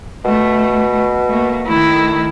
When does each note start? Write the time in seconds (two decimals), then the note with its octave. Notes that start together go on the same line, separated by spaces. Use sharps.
0.25 B2 A3
1.28 A3 A#3
1.66 D#3 A3 E4